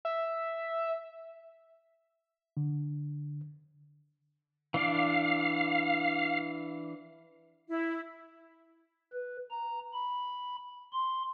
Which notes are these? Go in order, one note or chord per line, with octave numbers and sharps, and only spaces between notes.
E5
D3
E3 D4 D5 F5
E4
B4
A#5
B5
C6